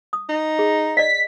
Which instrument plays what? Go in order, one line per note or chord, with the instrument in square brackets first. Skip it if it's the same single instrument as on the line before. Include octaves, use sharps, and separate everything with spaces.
[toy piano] D#6
[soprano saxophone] D#4
[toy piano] G#4
[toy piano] D5 D#5 [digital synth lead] B6